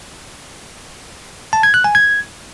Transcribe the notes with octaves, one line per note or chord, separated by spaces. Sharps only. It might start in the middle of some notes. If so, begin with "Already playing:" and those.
A5
G#6
F#6
G#5
G#6